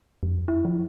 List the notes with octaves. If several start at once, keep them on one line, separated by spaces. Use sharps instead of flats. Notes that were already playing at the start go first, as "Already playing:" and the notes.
F2
E4
F3